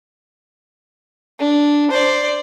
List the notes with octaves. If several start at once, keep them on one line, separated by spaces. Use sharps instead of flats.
D4
C5 D5